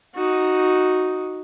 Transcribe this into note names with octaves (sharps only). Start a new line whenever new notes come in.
D#4 F#4